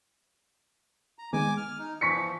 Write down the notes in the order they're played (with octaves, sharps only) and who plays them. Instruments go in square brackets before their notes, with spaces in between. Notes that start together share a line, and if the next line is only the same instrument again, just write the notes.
[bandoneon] A#5
[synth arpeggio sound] D#3 G#3 B3 [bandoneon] G#5 D6
[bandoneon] F6
D#4
[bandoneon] E3 F3 [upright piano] C#6 B6 C#7